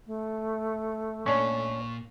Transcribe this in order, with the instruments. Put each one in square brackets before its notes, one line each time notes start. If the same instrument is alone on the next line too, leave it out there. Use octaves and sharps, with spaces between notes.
[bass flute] A3
[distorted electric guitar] A#2 [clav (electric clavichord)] C#4 D4 C#5 [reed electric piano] C#6